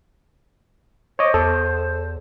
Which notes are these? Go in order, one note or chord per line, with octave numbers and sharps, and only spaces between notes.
C5 C#5 D#5 D6
E2 A4